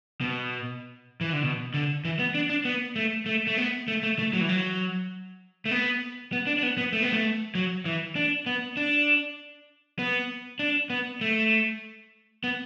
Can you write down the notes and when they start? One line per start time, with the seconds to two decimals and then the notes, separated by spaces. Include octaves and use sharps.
0.21 B2
1.21 E3
1.32 D3
1.43 B2
1.74 D3
2.05 E3
2.19 B3
2.35 D4
2.50 D4
2.65 B3
2.96 A3
3.26 A3
3.47 A3
3.58 B3
3.88 A3
4.03 A3
4.19 A3
4.33 F#3
4.41 E3
4.49 F#3
5.65 A3
5.71 B3
6.33 B3
6.47 D4
6.58 D4
6.63 B3
6.78 B3
6.93 A3
7.03 B3
7.13 A3
7.55 F#3
7.85 E3
8.16 D4
8.46 B3
8.77 D4
9.99 B3
10.59 D4
10.90 B3
11.21 A3
12.44 B3